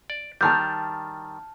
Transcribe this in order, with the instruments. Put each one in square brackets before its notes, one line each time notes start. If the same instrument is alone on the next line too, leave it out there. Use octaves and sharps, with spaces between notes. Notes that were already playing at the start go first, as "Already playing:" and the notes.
[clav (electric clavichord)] D5
[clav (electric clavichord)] D#3 G3 [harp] A5 F6 G6